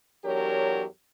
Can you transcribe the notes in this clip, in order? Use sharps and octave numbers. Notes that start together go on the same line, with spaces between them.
E2 F#3 D4 G4 A#4 C#5